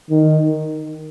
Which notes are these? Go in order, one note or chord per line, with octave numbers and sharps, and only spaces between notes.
D#3